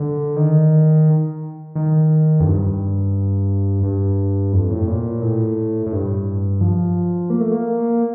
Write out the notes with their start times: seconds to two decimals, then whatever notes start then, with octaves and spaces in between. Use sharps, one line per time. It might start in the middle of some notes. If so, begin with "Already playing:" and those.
Already playing: D3
0.36 D#3
1.75 D#3
2.40 F2
2.44 G2
3.83 G2
4.53 F2
4.70 A2
4.88 A#2
5.22 A2
5.86 A2
5.92 G2
6.61 F3
7.30 A#3
7.40 A3
7.51 A#3